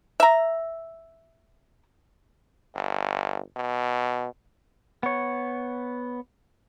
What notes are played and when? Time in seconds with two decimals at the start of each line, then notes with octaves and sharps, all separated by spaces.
0.20 E5 A#5
2.75 G1
3.56 B2
5.03 B3 C#5